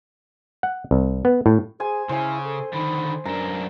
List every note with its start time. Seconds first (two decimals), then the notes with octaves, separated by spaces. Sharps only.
0.63 F#5
0.91 C2
1.25 B3
1.46 A2
1.80 G#4 C5 G#5
2.09 C#3 E4 C5 G#5
2.44 A4
2.73 D3 D#3 B5
3.25 F#2 D4 A#4 A#5